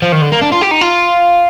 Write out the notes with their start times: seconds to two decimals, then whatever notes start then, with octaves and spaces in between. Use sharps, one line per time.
0.02 F3
0.12 D#3
0.22 D3
0.32 A#3
0.41 D4
0.52 F4
0.61 G4
0.71 D#4
0.81 F4